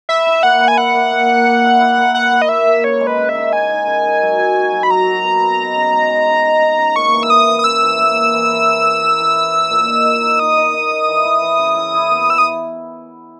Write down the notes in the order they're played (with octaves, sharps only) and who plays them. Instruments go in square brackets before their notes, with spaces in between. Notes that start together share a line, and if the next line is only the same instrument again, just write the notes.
[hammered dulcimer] B4 [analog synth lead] E5
[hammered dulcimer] E4
[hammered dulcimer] A#3 [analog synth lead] F#5
[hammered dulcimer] B4
[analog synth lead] G#5
[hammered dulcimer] E4 [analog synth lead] F#5
[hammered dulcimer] A#3
A#3
A#3
A#3
E4
E4
A#3
[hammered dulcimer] B4 [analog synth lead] F#5
[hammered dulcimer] A#3
[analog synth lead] D#5
[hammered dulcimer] A#3 [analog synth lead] E5
[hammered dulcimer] A#3
[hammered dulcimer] C#3 [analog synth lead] C#5
[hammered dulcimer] G#3
[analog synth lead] B4
[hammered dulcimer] C#3
[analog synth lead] E5
[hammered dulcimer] D#4
[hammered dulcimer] C#3 [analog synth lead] G#5
[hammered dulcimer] D#4
C#3
D#4
F#3
F#3
F#4
F#3
[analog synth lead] B5
[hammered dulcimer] F#3 [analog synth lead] A#5
[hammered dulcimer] F#3
B3
B3
D#4
C#3
G#3
G#3
D#4
D#4
D#4
C#3
[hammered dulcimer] A#3 [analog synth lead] C#6
[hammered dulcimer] E3
[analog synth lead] E6
[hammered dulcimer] E3 [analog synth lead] D#6
[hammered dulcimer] E3
[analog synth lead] D#6
[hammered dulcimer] C#4 [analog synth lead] E6
[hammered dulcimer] E3
A#3
C#4
E3
E3
A#4
A#4
A#4
E3
A#4
A#4
A#2
D#4
D#4
A#4
[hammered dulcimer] D#4 [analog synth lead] D#6
[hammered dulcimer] D#4
D#4
A#4
E3
E4
E3
C#3
E4
E4
B3
[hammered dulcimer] E3 [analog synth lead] E6
[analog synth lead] D#6